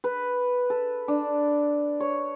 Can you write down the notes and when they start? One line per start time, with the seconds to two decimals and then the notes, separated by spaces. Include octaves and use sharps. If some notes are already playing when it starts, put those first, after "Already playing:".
0.04 B4
0.70 A4
1.08 D4
2.00 C#5